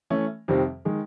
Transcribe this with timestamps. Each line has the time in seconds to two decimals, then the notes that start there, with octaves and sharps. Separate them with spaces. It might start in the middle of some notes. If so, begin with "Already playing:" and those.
0.10 E3 A3 C#4
0.48 F2 C3 D#3 G3 C4
0.85 D#3 G#3